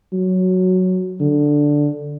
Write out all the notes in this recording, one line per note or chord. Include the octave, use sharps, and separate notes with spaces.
F#3
D3